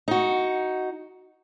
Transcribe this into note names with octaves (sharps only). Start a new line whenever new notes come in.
D#4 F#4